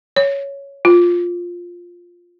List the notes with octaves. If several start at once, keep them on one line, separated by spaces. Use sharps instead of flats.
C#5
F4